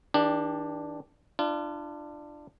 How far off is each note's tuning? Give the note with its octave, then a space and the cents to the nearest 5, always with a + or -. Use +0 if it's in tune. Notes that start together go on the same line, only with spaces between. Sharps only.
D#3 +45 D4 +0 G4 +25
D4 +15 F4 -35